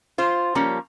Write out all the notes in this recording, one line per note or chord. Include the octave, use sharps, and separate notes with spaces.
F4 C5
F3 G3 A#3 C#4